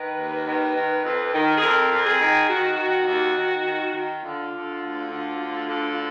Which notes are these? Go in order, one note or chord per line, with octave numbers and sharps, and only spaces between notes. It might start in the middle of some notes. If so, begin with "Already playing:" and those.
Already playing: D#3 B4
D#2
D#3
D#3
F2
D#3
G#4
F2 A#4
F2
G#4
D#3
D#3 F#4
D#3
D#2
D#3
D#3
D#3
D3 F4
D3
D2
D3
D2
D3